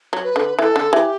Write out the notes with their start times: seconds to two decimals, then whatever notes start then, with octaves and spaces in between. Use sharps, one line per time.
0.13 F#3
0.24 B4
0.36 D3
0.59 E3 A4
0.76 D3
0.92 E3 G4